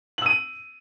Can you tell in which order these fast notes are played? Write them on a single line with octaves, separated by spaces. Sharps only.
F#7 E6 D#7